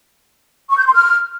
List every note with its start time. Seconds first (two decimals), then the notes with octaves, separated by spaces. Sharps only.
0.70 C#6
0.78 G6
0.86 C6
0.94 F6